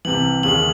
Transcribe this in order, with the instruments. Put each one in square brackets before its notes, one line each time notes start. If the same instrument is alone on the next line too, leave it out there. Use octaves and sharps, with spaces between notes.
[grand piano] C2 C3 E3 [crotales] F#7
[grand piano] D#2 C#3 G#3 C#4 G#4 [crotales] F#7